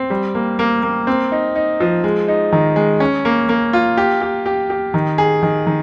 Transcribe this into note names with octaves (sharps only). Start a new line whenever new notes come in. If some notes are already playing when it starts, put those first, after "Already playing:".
Already playing: C4
G3
A#3
A#3
A#3
C4
D#4
D#4
F3
G#3
D#4
D#3
G#3
C#4
A#3
A#3
F4
G4
G4
G4
G4
D#3
G#4
D#3
D#3